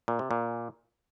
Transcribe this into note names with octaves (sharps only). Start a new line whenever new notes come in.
A#2
C3
A#2